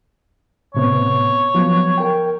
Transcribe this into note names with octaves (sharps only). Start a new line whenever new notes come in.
A2 C3 B3 C#5
F3 F#3 B3
A#4 G5